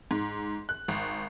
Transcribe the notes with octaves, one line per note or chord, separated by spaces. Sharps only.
G#2
F#6
G#1